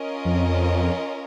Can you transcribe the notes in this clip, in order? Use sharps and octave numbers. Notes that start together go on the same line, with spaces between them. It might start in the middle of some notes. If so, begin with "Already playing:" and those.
Already playing: C#4 F4 A#4 D#5
F2